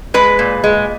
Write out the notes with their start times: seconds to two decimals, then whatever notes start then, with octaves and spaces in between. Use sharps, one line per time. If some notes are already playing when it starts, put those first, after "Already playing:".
0.14 G#3 B4
0.39 A#2
0.64 G#3